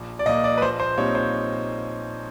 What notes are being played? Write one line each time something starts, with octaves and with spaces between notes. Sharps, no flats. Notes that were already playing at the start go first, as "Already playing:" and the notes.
Already playing: A#1
D5
A#2 F3 A#3 D#5
D5
B4
A#1 C5
C5
A#2 G3 C4 D#4 C#5
C5